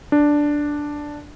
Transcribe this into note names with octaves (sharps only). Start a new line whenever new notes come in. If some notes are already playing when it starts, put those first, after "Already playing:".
D4